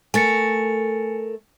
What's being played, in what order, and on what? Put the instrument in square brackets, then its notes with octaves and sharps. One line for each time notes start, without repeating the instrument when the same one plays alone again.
[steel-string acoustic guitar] A3 A#4 [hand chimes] G#5 A6 C#7